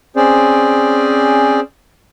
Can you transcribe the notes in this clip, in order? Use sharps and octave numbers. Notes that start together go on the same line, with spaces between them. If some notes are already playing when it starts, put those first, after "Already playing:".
C4 C#4 G#4 C5 D5